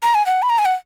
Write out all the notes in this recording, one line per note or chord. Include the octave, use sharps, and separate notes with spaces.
A#5
G#5
F#5
B5
A#5
G#5
F#5